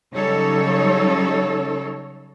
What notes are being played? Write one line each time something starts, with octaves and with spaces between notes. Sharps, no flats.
C#3 F#3 G3 D#4 A4 C#5